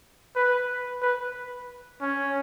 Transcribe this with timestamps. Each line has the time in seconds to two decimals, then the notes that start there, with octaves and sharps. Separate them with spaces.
0.36 B4
1.02 B4
2.01 C#4